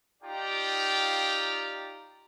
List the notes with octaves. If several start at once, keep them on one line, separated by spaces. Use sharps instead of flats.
D#4 F4 G4 D5 G5 A#5